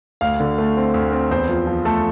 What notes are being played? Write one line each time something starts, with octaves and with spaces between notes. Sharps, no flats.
D2 F5
D3
A3
C4
D2
C4
E2 C5
F3
F3
A3 A4